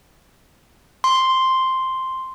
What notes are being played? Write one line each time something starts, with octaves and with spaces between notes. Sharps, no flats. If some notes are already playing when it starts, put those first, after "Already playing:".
C6